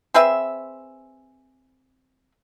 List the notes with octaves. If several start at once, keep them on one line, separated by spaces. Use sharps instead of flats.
C4 G#4 B4 E5